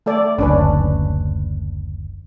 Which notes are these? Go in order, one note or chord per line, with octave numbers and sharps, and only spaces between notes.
A3 A4 D5
F#1 D2 C#4 D4 B4